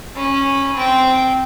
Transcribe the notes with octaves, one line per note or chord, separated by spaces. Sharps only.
C#4 B5
C4 G5